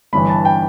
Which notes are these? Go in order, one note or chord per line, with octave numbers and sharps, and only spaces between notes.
G1 G2 E3 B5
A5
G5